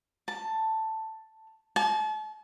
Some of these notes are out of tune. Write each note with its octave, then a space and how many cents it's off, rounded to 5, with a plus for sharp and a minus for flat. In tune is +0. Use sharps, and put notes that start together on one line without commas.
A5 +5
A5 -40